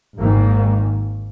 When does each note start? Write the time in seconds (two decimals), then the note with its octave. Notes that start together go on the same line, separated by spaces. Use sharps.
0.18 G#1 G#2 D#3 A#3